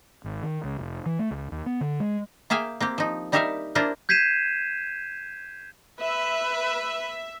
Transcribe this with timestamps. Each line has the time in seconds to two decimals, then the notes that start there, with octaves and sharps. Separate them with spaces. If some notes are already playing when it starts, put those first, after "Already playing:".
0.24 G#1
0.43 D#3
0.64 C#2
0.79 F1
1.06 E3
1.19 A3
1.31 C#2
1.52 D#2
1.66 B3
1.81 D3
2.00 G#3
2.50 A#3 G#4 E5 F5 G5
2.80 A#3 C4 G4
2.98 F3 D#4
3.32 G3 D#4 G4 A#4 E5 F5
3.75 A#3 D4 E4 F4 A#4 C5
4.09 G6 G#6 B6 C7 D#7 E7
6.01 B4 E5